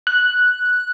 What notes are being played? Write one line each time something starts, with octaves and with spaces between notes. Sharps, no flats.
F#6